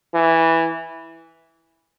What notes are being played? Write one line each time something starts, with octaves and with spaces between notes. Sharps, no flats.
E3